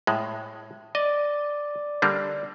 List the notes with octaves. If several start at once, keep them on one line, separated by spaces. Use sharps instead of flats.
A2 G#3
D5 D#5
D3 G3 A#3